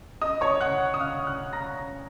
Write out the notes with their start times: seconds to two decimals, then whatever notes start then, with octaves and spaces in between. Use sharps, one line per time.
0.22 D#5 D#6
0.41 C#5 C#6
0.61 F#5 F#6
0.94 D#6
1.00 F5 F6
1.27 F#5 F#6
1.53 A#5 A#6